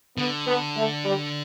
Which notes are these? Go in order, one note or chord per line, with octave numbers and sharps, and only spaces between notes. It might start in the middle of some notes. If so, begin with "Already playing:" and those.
D3 B3
B3
A3
G3